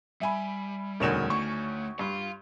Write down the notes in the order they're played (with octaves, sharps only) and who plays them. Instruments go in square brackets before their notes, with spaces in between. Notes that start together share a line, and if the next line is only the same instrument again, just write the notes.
[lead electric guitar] G3 [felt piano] E5 G#5 B5
[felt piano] E1 A#4 E7 [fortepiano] D2 D#3 C#4
[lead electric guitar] A3 [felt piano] C#6
[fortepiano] G2 [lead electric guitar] F5 C6